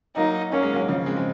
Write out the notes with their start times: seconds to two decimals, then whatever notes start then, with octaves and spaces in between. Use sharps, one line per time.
0.17 F#3 A#3 D#4
0.53 A#3 C#4
0.63 G#3
0.73 F#3 A#3
0.88 C#3 F3
1.06 G#3 C4
1.17 G#3